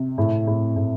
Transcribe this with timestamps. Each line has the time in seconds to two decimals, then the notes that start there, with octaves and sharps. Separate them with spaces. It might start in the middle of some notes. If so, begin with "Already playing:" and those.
Already playing: C3
0.18 A2
0.47 A2
0.76 A2